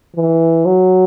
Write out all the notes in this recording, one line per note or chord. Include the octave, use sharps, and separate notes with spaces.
E3
F#3